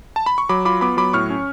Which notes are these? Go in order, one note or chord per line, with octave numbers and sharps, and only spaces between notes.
A5
B5
C#6
F#3 B5 D6
F4 B5 D6
B3 B5 D6
F#3 B5 D6
A2 C#6 F6
C#4